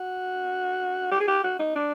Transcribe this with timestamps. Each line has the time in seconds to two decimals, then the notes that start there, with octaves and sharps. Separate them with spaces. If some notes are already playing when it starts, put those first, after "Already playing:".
Already playing: F#4
1.12 G4
1.20 G#4
1.27 G4
1.44 F#4
1.59 D#4
1.76 D4